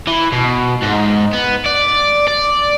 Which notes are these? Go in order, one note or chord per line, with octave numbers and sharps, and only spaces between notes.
E3
B2
G#2
B3
D5
D5